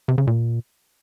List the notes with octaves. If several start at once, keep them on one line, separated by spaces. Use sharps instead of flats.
C3
C#3
A#2